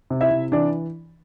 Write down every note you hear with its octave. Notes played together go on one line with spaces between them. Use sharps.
C3
E4 E5
C3
E3 D4 D5